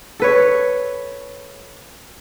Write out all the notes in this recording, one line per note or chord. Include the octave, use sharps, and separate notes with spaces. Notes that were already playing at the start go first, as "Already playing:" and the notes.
A4 B4 C#5